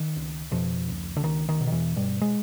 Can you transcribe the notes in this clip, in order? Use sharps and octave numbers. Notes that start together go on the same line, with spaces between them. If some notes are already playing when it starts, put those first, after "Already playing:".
Already playing: D#3
C#2
F2 B2 F3
C#2
D3
C#2 D#3
D#3
B2
D#3
E2 E3
G2 B2 G3
G#3